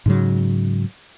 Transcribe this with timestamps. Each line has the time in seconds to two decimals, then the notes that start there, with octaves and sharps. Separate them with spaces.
0.06 G#2 C#3 F#3